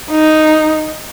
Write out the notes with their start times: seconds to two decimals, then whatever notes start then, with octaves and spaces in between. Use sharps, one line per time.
0.11 D#4